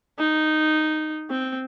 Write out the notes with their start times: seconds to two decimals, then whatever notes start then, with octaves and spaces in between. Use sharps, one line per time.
0.19 D#4
1.30 C4